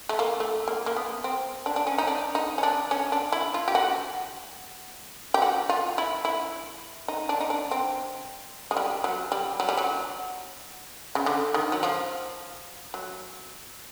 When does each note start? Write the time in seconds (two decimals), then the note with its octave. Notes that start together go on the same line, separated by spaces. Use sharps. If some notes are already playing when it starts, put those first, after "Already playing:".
0.09 A3
0.19 A#3
0.40 A3
0.68 A#3
0.86 A#3
0.96 B3
1.24 C4
1.66 D4
1.76 D4
1.87 C#4
1.98 D#4
2.07 D4
2.35 D#4
2.58 C#4
2.63 D4
2.91 C#4
3.12 D4
3.32 E4
3.54 F4
3.68 G4
3.75 F#4
5.34 G4
5.42 F#4
5.69 F4
5.98 E4
6.25 E4
7.08 D#4
7.29 D4
7.40 D#4
7.50 D4
7.71 C4
8.71 G#3
8.77 G3
9.04 F#3
9.32 G3
9.60 F#3
9.69 G3
9.77 F#3
11.15 C#3
11.26 D3
11.54 D#3
11.72 F#3
11.83 F3
12.94 F#3